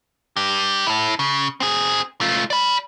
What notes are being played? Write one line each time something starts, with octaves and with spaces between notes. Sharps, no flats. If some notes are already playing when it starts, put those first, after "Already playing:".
D4 G4
E4 A4
C#3
C4 G#4
A3 F4
D5 B5